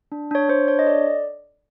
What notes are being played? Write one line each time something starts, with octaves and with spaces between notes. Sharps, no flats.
D4
D4 C#5
D4 C5
D4 C#5
D#5
A4 D5